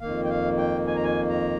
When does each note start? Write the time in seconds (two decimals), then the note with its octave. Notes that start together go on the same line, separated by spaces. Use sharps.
0.01 F2 D#3 A#3 F5
0.24 G5
0.29 F5
0.58 G5
0.87 G#5
0.96 A#5
1.03 G#5
1.29 A#5